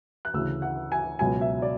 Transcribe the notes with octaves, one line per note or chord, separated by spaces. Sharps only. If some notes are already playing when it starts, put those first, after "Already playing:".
F#6
D2 C#3 E3 E6
F#5
G#5
C#2 B2 F#3 G#5
E5
D5